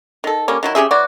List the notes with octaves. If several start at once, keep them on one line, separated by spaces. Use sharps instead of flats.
D#3 A4
G3 A#3 C#4
D#3 F#3 E4
C#4 G4 G#4 E5
E3 F#3 F#4 D5